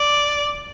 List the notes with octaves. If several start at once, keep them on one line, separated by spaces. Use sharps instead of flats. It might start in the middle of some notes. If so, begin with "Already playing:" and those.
Already playing: D5